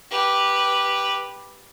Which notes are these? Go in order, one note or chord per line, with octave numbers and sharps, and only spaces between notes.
G4 B4